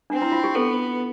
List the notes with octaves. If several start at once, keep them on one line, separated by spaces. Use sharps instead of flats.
C4 D4
E4
F4
G4
B3 A4